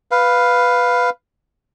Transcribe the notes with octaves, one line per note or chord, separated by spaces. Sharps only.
B4 F5